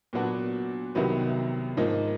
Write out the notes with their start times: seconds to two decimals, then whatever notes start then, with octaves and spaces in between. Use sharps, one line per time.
0.13 A#2 F#3 B3 D4 F#4
0.95 C2 C3 D#3 F#3 B3
1.77 G#2 F3 A#3 D#4